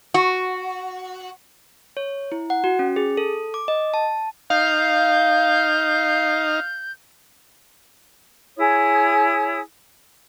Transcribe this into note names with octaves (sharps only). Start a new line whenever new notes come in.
F#4
C#5
E4
F#5
F#4
C#4
G#4
A4
D6
D#5
A5
D#4 F5 G6
E4 G#4 C#5 D#6